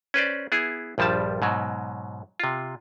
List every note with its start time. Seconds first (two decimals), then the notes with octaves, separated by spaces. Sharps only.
0.14 C#4 B4 C5 D5
0.52 B3 E4 G#4
0.98 A#1 G2 F3 G3 A5
1.42 G#2 B2 F#3
2.40 C3 F4